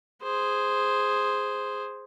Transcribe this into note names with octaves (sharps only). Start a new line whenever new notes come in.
G#4 C5